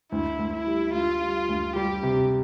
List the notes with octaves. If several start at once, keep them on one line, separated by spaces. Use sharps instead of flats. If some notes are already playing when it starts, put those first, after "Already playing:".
D2 E4
D2
E4
G3
D2 F4
G3
D2
G3 G4
C3